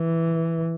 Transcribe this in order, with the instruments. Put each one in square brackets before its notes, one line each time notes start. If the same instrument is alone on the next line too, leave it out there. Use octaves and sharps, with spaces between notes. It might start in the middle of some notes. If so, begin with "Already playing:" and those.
Already playing: [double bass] E3